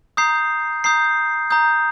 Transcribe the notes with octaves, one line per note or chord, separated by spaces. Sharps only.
A#5 D#6 G6 C7
A#5 D#6 G6 C7
A#5 D#6 G6